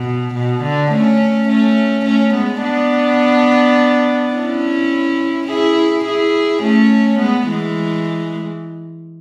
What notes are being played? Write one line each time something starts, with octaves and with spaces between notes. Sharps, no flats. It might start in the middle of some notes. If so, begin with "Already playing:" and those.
Already playing: B2
B2
D3
A3 C#4
A3 C#4
A3 C#4
G#3 B3
B3 D4
C#4 E4
E4 G#4
E4 G#4
A3 C#4
G#3 B3
E3 G#3